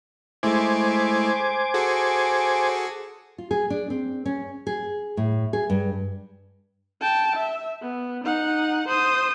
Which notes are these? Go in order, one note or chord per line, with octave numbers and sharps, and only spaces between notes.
G#3 A3 E4 C5 G#5 D6
F#4 G#4 A4
F4
G#4
D4
C4
C#4
G#4
A2
G#4
G2
G5 A5
E5
B3
D#4 F#5
C5 D#6